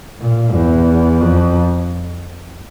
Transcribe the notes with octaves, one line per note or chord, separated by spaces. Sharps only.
A#2
E2
F2